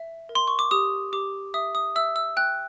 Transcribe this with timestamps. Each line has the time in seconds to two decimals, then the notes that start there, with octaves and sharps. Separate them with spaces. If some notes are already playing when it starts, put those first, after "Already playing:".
Already playing: E5
0.29 A#4
0.35 C6
0.47 C#6
0.59 D6
0.71 G4 D#6
1.13 G4 D6
1.54 E5 D#6
1.75 D#6
1.96 E5 E6
2.16 E6
2.37 G5 F#6